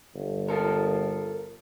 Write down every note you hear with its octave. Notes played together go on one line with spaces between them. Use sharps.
G1
F4 A4 A#4